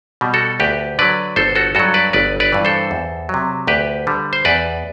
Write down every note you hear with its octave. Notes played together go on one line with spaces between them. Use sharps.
B2 G3
F#4 A4
D2 G4 B4
D3 F#3 B4 D5
G1 A4 C5
F#4 A4
G2 F#3 F#4 A4
B4 D5
G1 B4 D5
B4 D5
G2 E3
A4 C5
E2
C3 F#3
D2 G4 B4
D3 G3
C5
E2 B4 D5